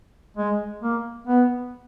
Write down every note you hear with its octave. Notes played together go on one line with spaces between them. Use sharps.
G#3
A#3
B3